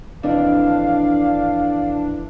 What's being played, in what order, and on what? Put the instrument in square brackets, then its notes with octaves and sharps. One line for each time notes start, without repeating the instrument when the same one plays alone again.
[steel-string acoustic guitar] F2 A2 E3 [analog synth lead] D4 [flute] F5